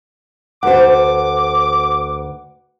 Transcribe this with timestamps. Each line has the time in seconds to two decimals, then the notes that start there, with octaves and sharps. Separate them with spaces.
0.63 D2 F#4 B4 C5 F#5 D6